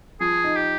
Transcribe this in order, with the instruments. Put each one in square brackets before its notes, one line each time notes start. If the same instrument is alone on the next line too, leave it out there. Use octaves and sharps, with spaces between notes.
[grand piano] F3 [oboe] G#4
[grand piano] D#4
[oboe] G4